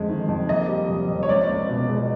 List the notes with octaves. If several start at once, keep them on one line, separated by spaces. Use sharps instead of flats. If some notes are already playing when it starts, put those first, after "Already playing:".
Already playing: F2 D3 G#3
D#3
F2
A#3 D#5
G3
F2
F2
C#5
C#2 D5
C#2
B2
G#3